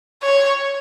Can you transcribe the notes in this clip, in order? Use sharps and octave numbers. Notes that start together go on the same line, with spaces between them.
C#5